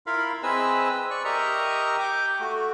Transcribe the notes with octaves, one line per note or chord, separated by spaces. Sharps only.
E4 F4 A#4 F5 B5
C4 G#4 B4 D#5 E5 E6
D5 C#6
G4 A#4 D#5 E5 A#5 C#6
G5 D6
A3 F#4